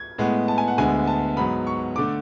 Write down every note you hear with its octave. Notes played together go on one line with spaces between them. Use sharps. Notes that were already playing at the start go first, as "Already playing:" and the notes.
Already playing: G#6
A2 G#3 B3
A5
G#5
F#5
D2 D3 G#3 B3 G#5
A5
G#2 F#3 B3 B5
C#6
D3 A3 D6